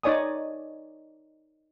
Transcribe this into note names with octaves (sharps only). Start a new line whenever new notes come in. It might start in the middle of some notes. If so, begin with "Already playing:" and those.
D#4 C#5 D5 G#5 D#6